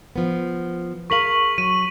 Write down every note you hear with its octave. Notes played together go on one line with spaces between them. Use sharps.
F3 B3
G#4 A#4 F5 C#6 B6 F#7
F#3 D#7